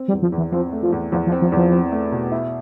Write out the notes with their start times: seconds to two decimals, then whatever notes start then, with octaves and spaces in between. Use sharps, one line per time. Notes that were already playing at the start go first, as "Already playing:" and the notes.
Already playing: C4
0.08 G3
0.13 E2
0.22 F3
0.32 E2
0.38 E3
0.52 F3 C4
0.72 A3
0.82 F3
0.92 E2
1.12 E2 F3
1.27 F3
1.32 C4
1.42 F3
1.52 E2 F3
1.72 C4
1.92 A3
2.12 B2
2.32 E4